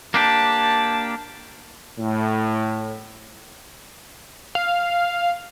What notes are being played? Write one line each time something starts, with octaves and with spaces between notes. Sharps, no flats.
A#3 D4 G4 A5
A2
F5